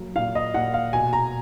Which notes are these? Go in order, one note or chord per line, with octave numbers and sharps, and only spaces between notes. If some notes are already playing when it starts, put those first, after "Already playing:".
Already playing: F#3 A#3
A#2 F5
D#5
A#2 F#5
F5
B2 G#5
A#5